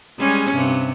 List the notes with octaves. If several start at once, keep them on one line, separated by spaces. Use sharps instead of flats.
G3 G#3 C#4
G2 C3